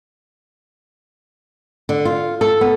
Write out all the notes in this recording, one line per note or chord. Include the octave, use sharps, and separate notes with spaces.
D3
F4
A4
B3